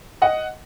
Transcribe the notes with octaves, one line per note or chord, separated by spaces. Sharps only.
D#5 F#5